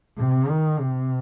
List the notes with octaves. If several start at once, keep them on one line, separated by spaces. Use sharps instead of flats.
C3
D#3
C3